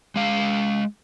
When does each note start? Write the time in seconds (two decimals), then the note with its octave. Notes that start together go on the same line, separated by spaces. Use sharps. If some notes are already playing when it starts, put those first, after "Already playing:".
0.16 G#3 F5